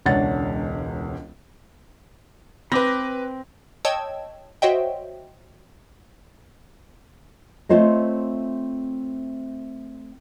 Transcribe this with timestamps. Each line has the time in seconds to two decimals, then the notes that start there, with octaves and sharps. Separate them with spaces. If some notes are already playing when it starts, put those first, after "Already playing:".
0.06 E1 C#2 D4 C#5 F#5 A6
2.72 C4 B4 B5 D6 A#6
3.85 C#5 D#5 G5 A5 E6 G#6
4.62 F#4 C5 C#5 D#5 E5 G5
7.69 A3 C4 F4 C5 C#5 D#5